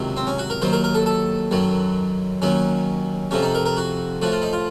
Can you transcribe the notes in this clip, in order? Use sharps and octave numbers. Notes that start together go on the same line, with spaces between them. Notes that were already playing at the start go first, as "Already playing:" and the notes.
Already playing: C#2 C3 D#3 F#3
C4
C#4
F#4
A#4
D#2 D#3 F#3 C5
A#4
A#4
A4
A4
F#2 D#3 F#3
D#2 D#3 F#3 C#4
F2 C3 F3 C#4
D#4
A#4
A#4
F#4
A2 F3 F#4
F4
D#4
F4